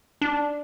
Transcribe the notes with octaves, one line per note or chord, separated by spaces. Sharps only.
D4